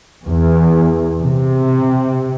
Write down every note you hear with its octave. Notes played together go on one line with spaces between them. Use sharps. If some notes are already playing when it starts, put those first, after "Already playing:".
E2
C3